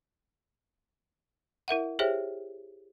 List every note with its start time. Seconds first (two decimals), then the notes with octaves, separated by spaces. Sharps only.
1.68 E4 A#4 E5 F#5
1.99 G4 G#4 C5 C#5 E5 G5